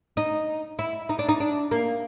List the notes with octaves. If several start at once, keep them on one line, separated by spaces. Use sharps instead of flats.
D#4
E4
D#4
D4
D#4
D4
A#3